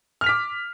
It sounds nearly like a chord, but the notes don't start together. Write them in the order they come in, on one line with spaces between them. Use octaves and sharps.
F6 F7 B6 D6